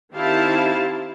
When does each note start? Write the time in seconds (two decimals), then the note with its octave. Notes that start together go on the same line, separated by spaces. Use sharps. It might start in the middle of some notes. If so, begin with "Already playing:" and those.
0.13 D#3 C4 E4 G4 F5 A5